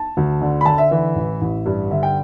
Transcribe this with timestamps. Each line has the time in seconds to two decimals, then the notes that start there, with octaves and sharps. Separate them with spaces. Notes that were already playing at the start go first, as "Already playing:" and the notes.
Already playing: A5
0.17 D2
0.41 D3
0.61 B5
0.66 D3 A5
0.78 E5
0.91 E3 E5
1.15 A1
1.41 A1
1.66 G2
1.91 D3 E5
2.03 G5